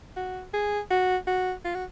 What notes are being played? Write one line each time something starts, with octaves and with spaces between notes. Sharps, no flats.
F#4
G#4
F#4
F#4
F4
F#4